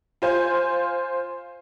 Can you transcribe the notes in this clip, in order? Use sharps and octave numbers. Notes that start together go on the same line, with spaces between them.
F4 C5 G#5